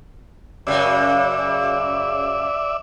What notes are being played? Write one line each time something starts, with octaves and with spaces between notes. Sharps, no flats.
F#2 C#3 G#3 D5 E5